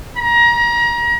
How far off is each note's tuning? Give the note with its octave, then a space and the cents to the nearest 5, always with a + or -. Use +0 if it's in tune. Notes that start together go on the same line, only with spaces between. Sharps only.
A#5 +30